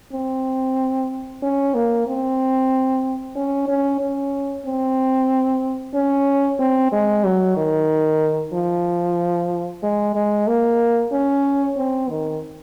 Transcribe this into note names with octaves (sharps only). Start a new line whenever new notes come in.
C4
C#4
A#3
C4
C#4
C#4
C#4
C4
C#4
C4
G#3
F#3
D#3
F3
G#3
G#3
A#3
C#4
C4
D#3